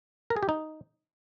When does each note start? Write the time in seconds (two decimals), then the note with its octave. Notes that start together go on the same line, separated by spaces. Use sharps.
0.30 A#4
0.36 G#4
0.43 G4
0.49 D#4